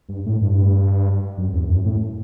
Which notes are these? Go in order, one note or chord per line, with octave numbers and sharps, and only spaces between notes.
G2
A2
G2
F#2
E2
F#2
A2